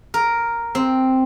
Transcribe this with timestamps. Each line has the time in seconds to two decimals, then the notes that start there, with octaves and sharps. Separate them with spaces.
0.14 A#4
0.75 C4